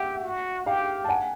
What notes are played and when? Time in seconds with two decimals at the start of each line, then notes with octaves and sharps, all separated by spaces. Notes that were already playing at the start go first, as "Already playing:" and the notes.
Already playing: G4 E5 F#5
0.24 F#4
0.66 G4 F5 G5
1.04 A5
1.08 F#5 G#5